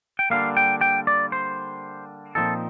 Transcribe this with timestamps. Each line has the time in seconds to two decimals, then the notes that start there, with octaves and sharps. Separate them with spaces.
0.19 G5
0.30 D3 G3 A#3 F5
0.57 G5
0.81 G5
1.07 D5
1.32 C5
2.35 A#2 F3 C4 D#4 A4